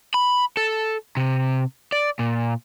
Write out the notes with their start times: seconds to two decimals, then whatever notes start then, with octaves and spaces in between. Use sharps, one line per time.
0.14 B5
0.57 A4
1.17 C3
1.92 D5
2.19 A#2